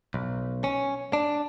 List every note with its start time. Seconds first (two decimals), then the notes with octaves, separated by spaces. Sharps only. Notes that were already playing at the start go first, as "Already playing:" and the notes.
0.14 B1
0.64 C#4
1.13 D4